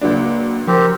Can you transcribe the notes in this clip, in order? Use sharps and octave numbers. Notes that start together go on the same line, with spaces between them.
C#2 F#3 A#3 D4
F3 C4 G4 A#4